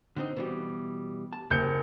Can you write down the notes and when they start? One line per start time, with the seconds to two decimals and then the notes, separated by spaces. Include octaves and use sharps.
0.16 D3 C4 D#4
0.36 B2 E3 G3
1.33 A5
1.50 F#1 C3 G6 C#7